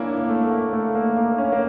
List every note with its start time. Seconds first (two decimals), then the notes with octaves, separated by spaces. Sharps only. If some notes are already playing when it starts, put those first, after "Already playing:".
Already playing: A#3 C#4 D4 E4
0.17 A#3
0.29 A3
0.44 A3
0.51 A#3
0.73 A3
0.95 A#3
1.17 A#3
1.38 C#4
1.52 A#3